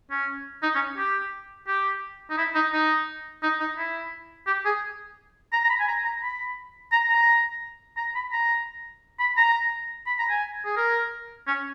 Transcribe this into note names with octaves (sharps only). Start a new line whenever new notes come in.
C#4
D#4
C#4
G4
G4
D#4
E4
D#4
D#4
D#4
D#4
E4
G4
G#4
A#5
A#5
B5
G#5
A#5
A#5
B5
A#5
A#5
A#5
B5
A#5
B5
A#5
B5
A#5
G#5
G#4
A#4
C#4